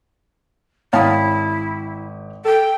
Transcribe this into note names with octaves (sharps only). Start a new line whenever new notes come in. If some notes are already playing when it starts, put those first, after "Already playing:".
G#1 E4 C#5 F5 G5 A5 D#6
A4 G5